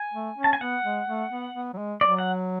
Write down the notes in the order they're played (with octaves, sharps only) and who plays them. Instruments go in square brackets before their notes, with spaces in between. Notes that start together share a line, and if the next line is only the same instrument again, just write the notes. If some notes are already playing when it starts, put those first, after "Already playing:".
Already playing: [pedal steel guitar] G#5
[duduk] A3
C#4
[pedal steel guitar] A5
G#5
[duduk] B3 [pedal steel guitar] F#5
[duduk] G#3
A3
B3
B3
F#3
G#3
[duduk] F#3 [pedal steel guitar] D5
[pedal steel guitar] F#5